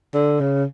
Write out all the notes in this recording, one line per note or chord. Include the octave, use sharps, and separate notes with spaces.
D3
C#3